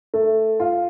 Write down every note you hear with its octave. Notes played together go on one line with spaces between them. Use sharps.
A3
F4